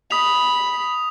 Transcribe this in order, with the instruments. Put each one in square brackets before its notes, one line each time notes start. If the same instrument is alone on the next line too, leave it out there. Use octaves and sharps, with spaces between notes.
[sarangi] B5 [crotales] D#6 B6 F7